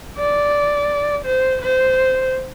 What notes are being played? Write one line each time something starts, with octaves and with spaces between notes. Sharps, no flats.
D5
C5
C5